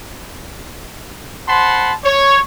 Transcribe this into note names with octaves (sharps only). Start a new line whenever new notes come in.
C5 F#5 A5 B5 C6
C#5